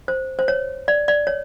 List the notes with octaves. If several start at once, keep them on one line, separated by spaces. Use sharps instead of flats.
C5
C5
C#5
D5
D5
C#5